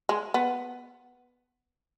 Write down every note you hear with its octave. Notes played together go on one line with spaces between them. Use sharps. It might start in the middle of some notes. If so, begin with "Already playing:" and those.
G#3
B3